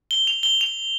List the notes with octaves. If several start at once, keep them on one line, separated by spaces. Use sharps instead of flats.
G7
F7
G7
F7